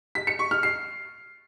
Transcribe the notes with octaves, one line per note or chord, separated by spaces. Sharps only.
B6
C#7
C#6
F6
C7